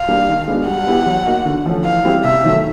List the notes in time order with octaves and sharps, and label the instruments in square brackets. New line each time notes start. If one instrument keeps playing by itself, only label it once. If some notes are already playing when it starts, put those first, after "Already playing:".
Already playing: [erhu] F5
[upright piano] G3 A#3 D4
D#3
G#3 B3 D4 F#4
[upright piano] G3 [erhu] F#5
[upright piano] B3 E4 G4
F#3
A#3 D#4 F#4
D3
F3 A3 C#4
[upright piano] E3 [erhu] F5
[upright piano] G3 C4 E4 G4
[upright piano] C3 [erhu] E5
[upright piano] D#3 F#3 A3